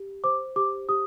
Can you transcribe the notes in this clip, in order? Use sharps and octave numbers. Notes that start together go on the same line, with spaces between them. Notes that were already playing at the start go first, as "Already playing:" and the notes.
Already playing: G4
C5 D6
G4 D6
G4 D#6